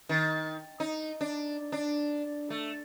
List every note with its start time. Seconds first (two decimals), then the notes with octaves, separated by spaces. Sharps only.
0.09 D#3
0.80 D#4
1.21 D4
1.72 D4
2.50 A3